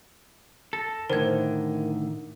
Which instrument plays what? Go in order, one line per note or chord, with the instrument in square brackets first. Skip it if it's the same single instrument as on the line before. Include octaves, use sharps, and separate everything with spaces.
[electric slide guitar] A4 [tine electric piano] A#6
[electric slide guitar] A2 D3 D#3 [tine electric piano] A#4 [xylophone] C5 G#6